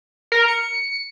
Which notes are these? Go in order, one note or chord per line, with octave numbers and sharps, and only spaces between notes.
A#4
C#7